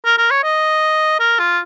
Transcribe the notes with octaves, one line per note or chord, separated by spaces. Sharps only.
A#4
A#4
C#5
D#5
A#4
F4